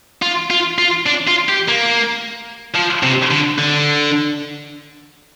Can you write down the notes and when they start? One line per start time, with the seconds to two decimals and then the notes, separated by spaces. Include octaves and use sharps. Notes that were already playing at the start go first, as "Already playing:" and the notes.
0.22 F4
0.50 F4
0.78 F4
1.06 D4
1.27 F4
1.49 G4
1.69 A#3
2.75 F3
3.03 C3
3.31 D3
3.58 D3